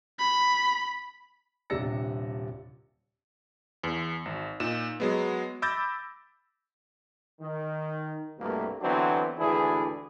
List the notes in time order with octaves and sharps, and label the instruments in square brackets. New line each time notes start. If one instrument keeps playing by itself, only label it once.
[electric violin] B5
[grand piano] D#1 C3 D4 E6 A#6 C#7
[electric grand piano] E2
G#1
A#2 D#4 E7
F#3 G#3 B3
B5 D6 E6 G6 A6 A#6
[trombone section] D#3
C2 G2 B2 A3 A#3
D3 E3 F#3 B3 C4 D4
G#1 D2 E3 D4 E4 G#4